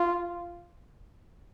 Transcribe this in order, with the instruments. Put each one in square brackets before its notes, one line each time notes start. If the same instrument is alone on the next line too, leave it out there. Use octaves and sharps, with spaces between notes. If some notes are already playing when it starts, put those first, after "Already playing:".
Already playing: [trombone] F4